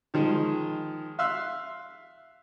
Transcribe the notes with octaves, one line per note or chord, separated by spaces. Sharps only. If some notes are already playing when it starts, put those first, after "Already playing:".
D#3 F3 G#3
E5 F5 C6 E6 F#6